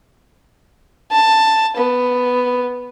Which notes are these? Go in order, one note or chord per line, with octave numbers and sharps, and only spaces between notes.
A5
B3